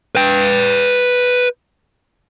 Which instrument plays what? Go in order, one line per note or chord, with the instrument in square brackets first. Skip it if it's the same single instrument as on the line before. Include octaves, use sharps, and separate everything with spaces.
[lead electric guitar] B4 G5